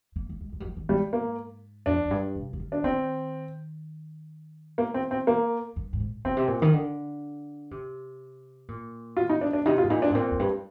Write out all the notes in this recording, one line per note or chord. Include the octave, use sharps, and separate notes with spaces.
A#3
A#3
G#3
G#3
G3
F3
D#3
G#2 G3
A#3
F2 D4
F2
G2
C3
F3
D#3
D4
D#3 C4
A#3
C4
C4
A#3
G2
G#2
A#2
A#2 C4
C3
A#2
D#3
D3
C3
A#2
F4
D#4
D4
D4
C3 D#4
F4
G#2
A#2 D#4
D4
G#2
A#2 C4
F2
G2